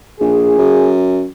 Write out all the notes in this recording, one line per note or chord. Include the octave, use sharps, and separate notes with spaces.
A#1 G#4
F#2